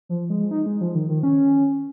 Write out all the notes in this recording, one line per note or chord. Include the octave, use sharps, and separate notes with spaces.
F3
G#3
D#4
G#3
F3
D#3
D#3
C#4